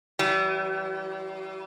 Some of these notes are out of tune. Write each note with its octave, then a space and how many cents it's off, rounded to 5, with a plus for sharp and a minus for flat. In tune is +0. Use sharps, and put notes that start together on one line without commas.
E3 +0 G3 -45